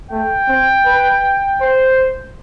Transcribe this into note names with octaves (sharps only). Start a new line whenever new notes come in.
A3 G5
C4
B4
C5